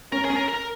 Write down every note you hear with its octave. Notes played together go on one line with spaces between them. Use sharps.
C#4 A#4
G#4
C#4
A#4
A#4